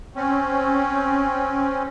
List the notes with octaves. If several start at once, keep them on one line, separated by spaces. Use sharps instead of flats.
C4 C#4